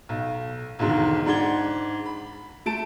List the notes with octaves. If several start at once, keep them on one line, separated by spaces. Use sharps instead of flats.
B1
B1 E2 G#2 D3 D#3
G#2 D4 F#5 G#6 G7
B5
A3 A5 D7